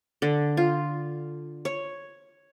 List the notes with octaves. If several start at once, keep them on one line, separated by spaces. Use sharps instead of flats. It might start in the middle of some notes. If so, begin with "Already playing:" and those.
D3
F4
C#5